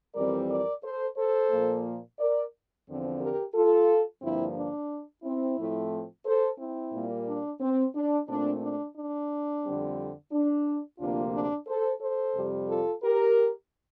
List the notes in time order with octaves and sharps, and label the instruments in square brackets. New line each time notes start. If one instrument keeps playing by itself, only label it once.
[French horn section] F2 E3 G3 C4 A#4 D5
A#4 D5
A4 C5
A4 C5
A#2 F3 A#3
A#4 D5
E2 D3 F3 C4
G4 A#4
F4 A4
G2 D3 F3 A#3 C4 E4
D4
C4 E4
A2 F3 A3 C4
A4 C5
C4 E4
A#2 G3 A#3
D4
C4
D4
A#2 A3 C4 D4
D4
D4
F2 D3 G3 C4
D4
D2 C3 F3 A#3 D4 F4
D4
A4 C5
A4 C5
F2 C3 G3
F4 A4
G4 A#4